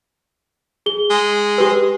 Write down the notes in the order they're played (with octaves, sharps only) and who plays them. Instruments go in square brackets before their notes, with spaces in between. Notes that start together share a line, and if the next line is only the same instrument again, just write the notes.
[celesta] G#4 G7
[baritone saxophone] G#3
[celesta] G4 B4